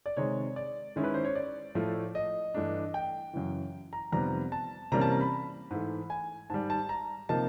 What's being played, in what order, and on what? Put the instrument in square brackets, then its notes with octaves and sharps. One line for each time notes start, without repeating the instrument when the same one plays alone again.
[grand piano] D5
C3 D#3 G#3 C#5
D5
D#3 G#3 C#4 E4
B4
C5
C#5
D5
A2 F3 A3
D#5
G2 E3 A3 D4
G5
F#2 C#3 E3
A#5
F2 C3 D#3 G3 B3 A#5
A5
C3 E3 G3 A#3 C#4 A#5
A5
A#5
B5
G#2 E3 A3
G#5
G#2 D#3 G3 A5
A5
A#5
C3 F3 A#3 D#4 A5